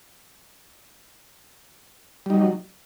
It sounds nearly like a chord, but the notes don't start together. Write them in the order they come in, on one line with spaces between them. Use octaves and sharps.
G3 D#4 F#3